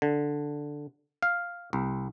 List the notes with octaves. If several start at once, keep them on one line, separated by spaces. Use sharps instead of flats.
D3
F5
C2